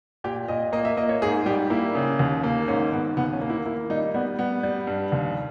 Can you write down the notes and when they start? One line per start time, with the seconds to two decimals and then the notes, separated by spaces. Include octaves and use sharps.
0.24 A#2 G4
0.48 A#2 D#5
0.73 A#3 D#5
0.85 E5
0.97 A#3 D#5
1.09 C#5
1.22 G#2 G#4
1.46 G3 G4
1.70 A#3 E4
1.95 C#3
2.19 D#2
2.44 A#3
2.68 G#2 C#4
2.92 G#2 B3
3.17 D#2 B3
3.33 C#4
3.41 A#3
3.50 E4
3.66 A#3 E4
3.90 G3 D#4
4.14 G3 B3
4.39 G3 B3
4.63 G3
4.87 G2
5.12 D#2